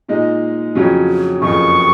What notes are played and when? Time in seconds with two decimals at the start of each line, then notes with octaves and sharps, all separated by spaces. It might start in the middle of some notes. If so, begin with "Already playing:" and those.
0.08 A#2 G#3 D#4
0.75 F2 C#3 F#3 C#4
1.42 F#1 F2 C#3 C#6